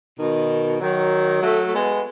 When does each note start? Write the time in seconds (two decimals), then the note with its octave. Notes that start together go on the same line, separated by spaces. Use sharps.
0.19 B2 D#3
0.81 D#3 F#3
1.42 F#3 A3
1.63 A3
1.73 G#3 B3